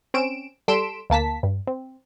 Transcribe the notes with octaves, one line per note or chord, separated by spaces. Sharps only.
C4 C#4 D7 E7
G3 A4 C6 B6 D7 E7
D2 A#3 A5 B6
G2
C4